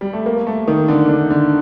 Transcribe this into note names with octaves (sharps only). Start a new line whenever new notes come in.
G3
A3
A#3
A3
D#3
D3
D3
D3